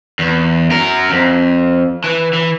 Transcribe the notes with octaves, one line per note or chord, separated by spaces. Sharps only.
E2
F#2 A#4
F2
E3
E3